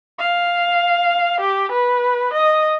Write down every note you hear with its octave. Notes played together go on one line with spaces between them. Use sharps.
F5
G4
B4
D#5